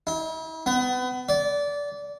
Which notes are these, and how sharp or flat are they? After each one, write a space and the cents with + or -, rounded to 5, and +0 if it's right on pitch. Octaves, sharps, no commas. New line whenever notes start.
E4 -45
B3 +30
D5 -20